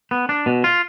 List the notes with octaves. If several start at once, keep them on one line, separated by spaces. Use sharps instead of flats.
B3
D4
B2
F4